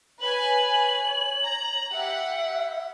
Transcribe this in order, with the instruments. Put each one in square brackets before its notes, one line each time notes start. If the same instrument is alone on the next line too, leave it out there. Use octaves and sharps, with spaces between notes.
[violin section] B4 G#5 [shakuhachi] C#5 [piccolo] F#7
[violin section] A#5
[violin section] G4 F#5 [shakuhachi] E5